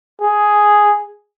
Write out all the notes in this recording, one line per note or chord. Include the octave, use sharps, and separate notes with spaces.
G#4